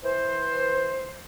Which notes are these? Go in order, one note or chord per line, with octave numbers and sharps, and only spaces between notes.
E3 C5